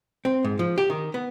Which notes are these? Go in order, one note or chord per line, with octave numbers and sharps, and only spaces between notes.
C4
G#2
F3
G4
D#3
B3